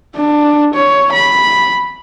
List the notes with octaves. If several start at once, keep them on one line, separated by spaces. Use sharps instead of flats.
D4
C#5
B5